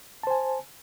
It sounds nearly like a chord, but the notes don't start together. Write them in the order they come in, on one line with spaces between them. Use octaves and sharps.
A5 C5 G#5